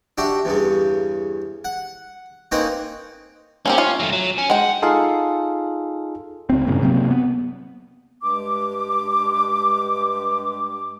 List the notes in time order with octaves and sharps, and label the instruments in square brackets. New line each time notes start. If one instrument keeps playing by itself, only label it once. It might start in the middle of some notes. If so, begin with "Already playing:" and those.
[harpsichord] D4 F#4 G4 E5
E2 G2 C#3
F#5
A#3 C4 C#4 D#4 B4 G5
[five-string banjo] A#3 C4 G4 [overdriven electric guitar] C#4
[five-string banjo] F4 C#5 F5
[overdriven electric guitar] F#3 A3
F#3
C#4
[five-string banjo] G#3 G5 [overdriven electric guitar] F#5
[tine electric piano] D#4 F4 G#4 A4 F5
[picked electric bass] C#2 C4
F#1 G2 A#2 C#3
C3 F#3 A#3 C4
B3
[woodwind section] G2 G#3 D6